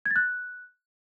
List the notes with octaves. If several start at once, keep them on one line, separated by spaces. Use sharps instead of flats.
G#6
A6
F#6